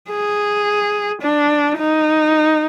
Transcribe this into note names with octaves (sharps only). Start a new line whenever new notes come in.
G#4
D4
D#4